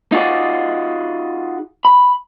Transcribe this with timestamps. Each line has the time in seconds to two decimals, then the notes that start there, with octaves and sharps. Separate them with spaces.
0.12 D#4 F4 F#4 G#4 D5
1.85 B5